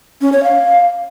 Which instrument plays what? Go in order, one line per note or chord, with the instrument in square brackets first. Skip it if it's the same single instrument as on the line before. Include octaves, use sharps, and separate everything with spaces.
[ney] C#4
C#5
F5